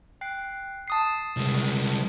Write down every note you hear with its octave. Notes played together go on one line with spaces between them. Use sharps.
G5 F#6 C7
A5 D#6 C7
C2 G#3